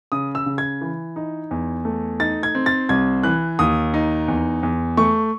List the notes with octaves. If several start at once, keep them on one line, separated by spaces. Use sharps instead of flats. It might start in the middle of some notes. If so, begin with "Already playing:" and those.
C#3 D#6
E6
C#3
G#6
E3
D#4
E2
A3
D#4 A6
G#6
C4
A6
C2 G#6
E3 F#6
D#2 D#6
D#4
E2
E2
A3 C#6